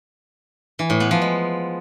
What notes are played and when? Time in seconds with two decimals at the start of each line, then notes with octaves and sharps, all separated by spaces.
0.79 E3
0.90 A2
1.00 B3
1.11 F3
1.21 G#3